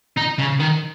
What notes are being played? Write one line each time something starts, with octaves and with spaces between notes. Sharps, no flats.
D#4
C#3
D#3